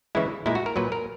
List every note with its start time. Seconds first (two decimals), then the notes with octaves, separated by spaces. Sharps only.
0.15 C#3 E3 G#3 E4
0.46 A#2 G#3 E4
0.55 F#4
0.66 A#4
0.76 A#2 F#3 B4
0.92 A#4